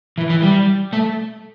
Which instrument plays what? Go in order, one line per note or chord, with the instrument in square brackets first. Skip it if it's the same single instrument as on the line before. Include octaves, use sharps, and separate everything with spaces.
[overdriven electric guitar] E3
E3
G3
A3